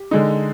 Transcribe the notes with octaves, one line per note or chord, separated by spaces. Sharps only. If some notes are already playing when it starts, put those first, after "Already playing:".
Already playing: G4
D3 G#3 D#4